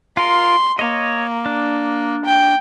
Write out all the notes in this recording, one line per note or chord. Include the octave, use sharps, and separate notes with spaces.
F4 A#4 C6
A#3 C#5 D#5
D4
G5